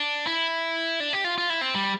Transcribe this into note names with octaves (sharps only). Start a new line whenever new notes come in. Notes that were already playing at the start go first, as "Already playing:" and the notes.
Already playing: D4
E4
D4
G4
F4
F4
E4
C4
G3